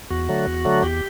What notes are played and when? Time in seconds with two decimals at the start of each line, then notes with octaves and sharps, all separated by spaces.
0.10 E2 F#4
0.29 D3 F#3 A3
0.47 E2
0.65 D3 F#3 A3
0.83 E2 G4